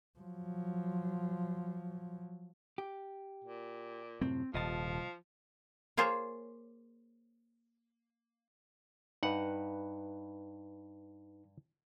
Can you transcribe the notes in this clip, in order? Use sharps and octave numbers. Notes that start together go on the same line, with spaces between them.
F3 F#3
G4
A#2
F#2 A2 C3 C4
D#1 C2 F3 D#5 A5
A#3 F4 G#4 C5 C#5
G2 D#4 B4 F#5